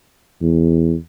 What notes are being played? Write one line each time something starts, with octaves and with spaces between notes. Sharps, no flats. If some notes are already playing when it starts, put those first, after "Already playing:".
E2